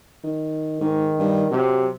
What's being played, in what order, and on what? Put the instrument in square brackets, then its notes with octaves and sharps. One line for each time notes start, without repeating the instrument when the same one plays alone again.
[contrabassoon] D#3
[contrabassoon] G#2 [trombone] D#3
[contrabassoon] G2
[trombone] C3 [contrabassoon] F#3